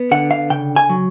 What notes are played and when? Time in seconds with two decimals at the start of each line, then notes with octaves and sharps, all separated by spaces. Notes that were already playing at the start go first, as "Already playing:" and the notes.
Already playing: B3
0.11 D3 F#5
0.31 F5
0.50 C#3 G5
0.76 G#5
0.89 F#3